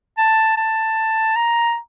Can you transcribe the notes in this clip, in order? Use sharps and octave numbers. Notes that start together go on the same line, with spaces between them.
A5
A5
A#5